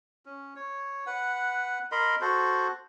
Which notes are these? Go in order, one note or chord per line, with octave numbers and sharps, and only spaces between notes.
C#4
C#5
B4 F#5
A#4 D#5 B5 C6
F#4 A4 C5